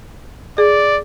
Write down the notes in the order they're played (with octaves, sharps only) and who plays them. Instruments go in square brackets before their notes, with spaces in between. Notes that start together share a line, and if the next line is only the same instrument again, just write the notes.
[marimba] G#4 [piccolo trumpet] D5